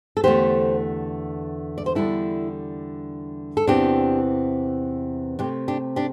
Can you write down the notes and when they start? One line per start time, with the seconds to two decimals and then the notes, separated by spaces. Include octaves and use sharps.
0.17 A4
0.23 E2 D3 A3 G4 C5
1.78 D5
1.86 C5
1.95 E2 D3 G3 D4 E4 A4
3.57 A4
3.67 E2 C3 E3 C4 D4 G4
5.39 C3 A3 C4 D4 G4
5.68 D4 G4
5.96 D4 G4